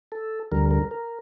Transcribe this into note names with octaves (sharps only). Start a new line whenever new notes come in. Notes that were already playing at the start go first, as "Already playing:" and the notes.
A4
D2 D3 G3 A#4
A#4
A#4